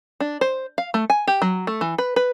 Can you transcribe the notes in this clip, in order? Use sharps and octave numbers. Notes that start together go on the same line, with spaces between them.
D4
C5
F5
A3
G#5
G4
F#3
A3
E3
B4
B4